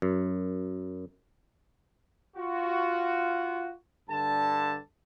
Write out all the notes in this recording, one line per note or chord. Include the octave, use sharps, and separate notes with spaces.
F#2
F4 F#4
G2 D3 A5